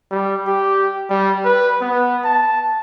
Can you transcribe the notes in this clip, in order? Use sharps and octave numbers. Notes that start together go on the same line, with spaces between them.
G3
G4
G3
B4
B3
A5